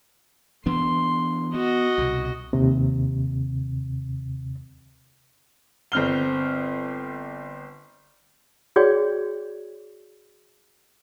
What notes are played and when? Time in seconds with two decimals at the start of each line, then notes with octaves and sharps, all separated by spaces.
0.66 E3 B3 D4 C6
1.54 B3 F#4 D#5
1.98 C2 B2
2.53 D#2 C3
5.92 G1 C4 F6 G7
8.76 F#4 G#4 C#5 D5 G5